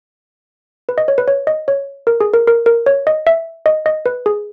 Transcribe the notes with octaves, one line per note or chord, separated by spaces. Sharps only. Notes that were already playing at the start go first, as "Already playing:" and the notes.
B4
D#5
C#5
B4
C#5
D#5
C#5
A#4
G#4
A#4
A#4
A#4
C#5
D#5
E5
D#5
D#5
B4
G#4